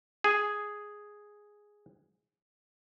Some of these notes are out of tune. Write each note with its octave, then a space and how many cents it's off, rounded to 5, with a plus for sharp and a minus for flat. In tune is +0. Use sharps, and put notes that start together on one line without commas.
G#4 +0